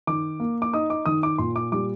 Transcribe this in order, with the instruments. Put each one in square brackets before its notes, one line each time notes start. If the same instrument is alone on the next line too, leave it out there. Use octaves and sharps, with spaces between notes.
[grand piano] D#3 D6
A#3
D6
D#4 D#6
D6
D#3 D#6
D6
A#2 C6
D6
G3 D6